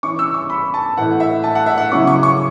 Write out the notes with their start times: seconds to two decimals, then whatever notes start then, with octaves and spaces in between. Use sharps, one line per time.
0.03 E3 C#4 E4 C#6
0.19 E6
0.34 C#6
0.50 B5
0.74 A5
0.97 A2 E3 A3 E4 F#5
1.20 E5
1.44 A5
1.55 F#5
1.66 E5
1.78 F#5
1.92 C#3 F#3 C#4 E4 C#6
2.07 C#6
2.23 C#6